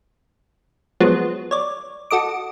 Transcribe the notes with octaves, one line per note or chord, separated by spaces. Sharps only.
F3 F#3 G#3 B3
C#5 D5
F#4 A4 D#5 D6